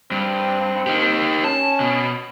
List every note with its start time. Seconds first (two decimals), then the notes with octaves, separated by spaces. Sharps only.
0.11 G2 C4
0.87 D#4 G4
1.44 C#4 A5
1.80 B2